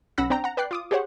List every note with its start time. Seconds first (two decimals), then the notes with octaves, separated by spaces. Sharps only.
0.18 B1 C#4 F#5 B5 E6 A#6
0.30 C4 D4 G5 A#5
0.44 F#5 A#5
0.57 B4 D5 G5 F#6 C7
0.71 F4 D6 D#6
0.91 G4 G#4 C5 C#5 F#5